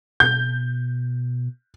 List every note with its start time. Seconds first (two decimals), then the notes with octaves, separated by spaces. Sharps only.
0.20 B2 G6